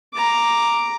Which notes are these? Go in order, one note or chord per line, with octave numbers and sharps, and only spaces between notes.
A#5 D6